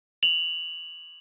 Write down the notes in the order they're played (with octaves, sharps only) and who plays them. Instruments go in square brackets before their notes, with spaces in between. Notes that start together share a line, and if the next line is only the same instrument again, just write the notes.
[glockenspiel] F7 F#7